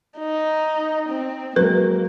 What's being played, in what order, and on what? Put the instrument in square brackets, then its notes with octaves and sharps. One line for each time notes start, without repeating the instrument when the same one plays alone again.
[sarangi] D#4
C4
[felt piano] F#3 G#3 [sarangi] A#3 [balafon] A#4 B4